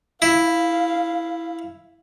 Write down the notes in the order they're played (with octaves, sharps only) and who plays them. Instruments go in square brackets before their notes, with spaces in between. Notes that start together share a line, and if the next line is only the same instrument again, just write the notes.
[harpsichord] E4 [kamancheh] F5